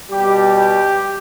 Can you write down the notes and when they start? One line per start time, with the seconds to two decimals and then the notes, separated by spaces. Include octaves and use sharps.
0.11 B2 G3 G4
0.56 G4